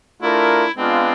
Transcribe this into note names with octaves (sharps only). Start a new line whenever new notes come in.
A3 D4 E4 F4 A#4
G#3 B3 C4 D4 F4